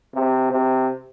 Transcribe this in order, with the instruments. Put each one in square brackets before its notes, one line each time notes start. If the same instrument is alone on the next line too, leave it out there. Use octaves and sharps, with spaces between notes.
[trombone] C3
C3